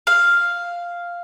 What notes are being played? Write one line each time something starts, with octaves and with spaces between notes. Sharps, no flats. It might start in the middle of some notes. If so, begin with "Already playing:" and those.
F5